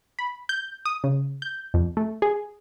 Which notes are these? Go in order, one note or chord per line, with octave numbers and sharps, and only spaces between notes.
B5
G6
D#6
C#3
G6
F2
A3
G#4